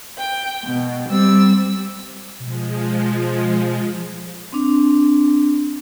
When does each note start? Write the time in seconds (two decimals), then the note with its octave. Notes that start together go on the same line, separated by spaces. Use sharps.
0.16 G5
0.64 B2
1.06 G3 C4 E6
2.40 B2 F3 G#3
4.53 C4 D4